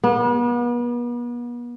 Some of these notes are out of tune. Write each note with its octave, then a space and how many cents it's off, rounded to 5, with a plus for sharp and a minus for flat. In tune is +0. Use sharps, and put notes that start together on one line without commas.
B3 -40